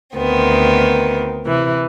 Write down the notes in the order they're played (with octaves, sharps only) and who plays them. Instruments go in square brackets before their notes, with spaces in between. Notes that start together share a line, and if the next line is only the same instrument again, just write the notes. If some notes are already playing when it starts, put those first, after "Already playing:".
[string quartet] D2 D#3 B3 C4
C3 E3